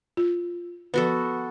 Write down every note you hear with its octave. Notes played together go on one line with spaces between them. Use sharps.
F4
F3 B3 F#4 A4 B4